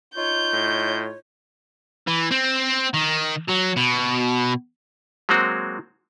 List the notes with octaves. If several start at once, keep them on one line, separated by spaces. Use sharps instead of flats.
D#4 F4 C#5 G6
A2
E3
C4
D#3
F#3
B2
F#3 G#3 A#3 C4 F#4